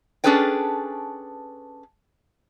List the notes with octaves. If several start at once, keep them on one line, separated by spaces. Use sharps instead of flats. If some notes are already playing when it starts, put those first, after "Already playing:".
C#4 D4 G#4 A4 B4 G5